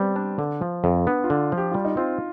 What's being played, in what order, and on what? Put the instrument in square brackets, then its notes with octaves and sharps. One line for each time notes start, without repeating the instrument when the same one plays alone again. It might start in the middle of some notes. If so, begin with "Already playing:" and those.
Already playing: [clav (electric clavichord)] G3 [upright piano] B3 C4
[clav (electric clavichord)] D4
D3
F3
F2
[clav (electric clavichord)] B3 [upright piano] D4
[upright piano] F4
[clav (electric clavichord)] D3
F3
[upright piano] G4
[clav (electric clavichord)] G3 [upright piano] F4
[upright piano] D#4
[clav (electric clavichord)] C4 [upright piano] F4